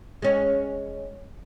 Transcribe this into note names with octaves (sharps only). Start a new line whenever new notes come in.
G#3 C#4